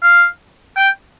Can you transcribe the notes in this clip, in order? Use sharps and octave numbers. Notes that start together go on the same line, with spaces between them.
F5
G5